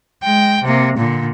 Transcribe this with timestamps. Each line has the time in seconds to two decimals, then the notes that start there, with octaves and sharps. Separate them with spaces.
0.23 G#3 G5
0.63 C3 A#3
0.97 A#2 D3